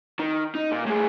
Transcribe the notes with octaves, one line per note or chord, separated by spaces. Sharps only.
D#3
D#4
A#2
A2 G#4